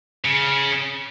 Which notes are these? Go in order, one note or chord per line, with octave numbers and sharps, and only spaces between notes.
C#3